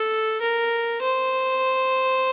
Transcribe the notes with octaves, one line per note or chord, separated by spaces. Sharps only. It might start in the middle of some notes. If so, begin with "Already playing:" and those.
Already playing: A4
A#4
C5